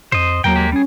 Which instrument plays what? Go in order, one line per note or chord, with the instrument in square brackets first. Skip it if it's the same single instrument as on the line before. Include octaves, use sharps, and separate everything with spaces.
[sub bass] F2 [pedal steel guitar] C5 D#5
[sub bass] D#2 [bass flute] F#3 [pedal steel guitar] A#3 A#4 G5
[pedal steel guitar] G#3 A#3 G4
[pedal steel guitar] G3 G#4 [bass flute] C#4